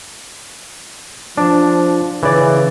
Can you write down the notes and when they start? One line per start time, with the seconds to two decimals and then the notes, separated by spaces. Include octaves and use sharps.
1.38 F3 D4
2.23 C#3 E3 D5